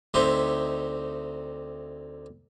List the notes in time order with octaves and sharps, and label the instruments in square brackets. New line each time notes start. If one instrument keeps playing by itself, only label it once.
[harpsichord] D2 C4 D#4 G4 E5 C6